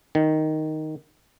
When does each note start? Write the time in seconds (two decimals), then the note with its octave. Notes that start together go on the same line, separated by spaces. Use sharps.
0.15 D#3